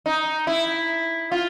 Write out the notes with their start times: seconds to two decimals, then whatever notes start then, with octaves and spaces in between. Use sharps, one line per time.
0.06 D#4
0.47 E4
1.32 F4